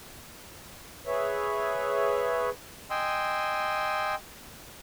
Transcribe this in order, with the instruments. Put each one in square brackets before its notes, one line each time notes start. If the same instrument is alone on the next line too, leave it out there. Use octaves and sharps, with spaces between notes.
[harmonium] G#4 B4 C#5 E5
[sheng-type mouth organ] D#5 G5 G#5 C6 E6